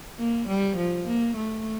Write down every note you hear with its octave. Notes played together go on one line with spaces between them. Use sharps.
A#3
G3
F3
A#3
A3